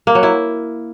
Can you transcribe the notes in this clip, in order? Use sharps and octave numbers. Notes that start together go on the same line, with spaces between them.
A#3
F#3
E4